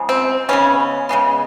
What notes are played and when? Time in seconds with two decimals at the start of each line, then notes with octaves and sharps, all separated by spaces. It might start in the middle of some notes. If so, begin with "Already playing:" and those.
Already playing: C#3 F3 G#3
0.09 C4
0.49 C#3 F3 G#3 B3 C#4
1.09 C#3 F3 G#3 B3